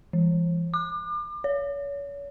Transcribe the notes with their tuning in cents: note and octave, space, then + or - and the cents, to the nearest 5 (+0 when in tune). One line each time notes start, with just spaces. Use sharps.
E3 +40
D6 +35
C#5 +35